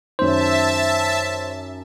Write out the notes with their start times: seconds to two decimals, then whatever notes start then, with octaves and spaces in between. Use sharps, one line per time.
0.19 F#2 D#3 C5 E5 A5